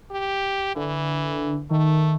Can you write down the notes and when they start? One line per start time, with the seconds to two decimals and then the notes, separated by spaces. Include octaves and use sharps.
0.11 G4
0.76 D3 E3
1.70 D#3 A3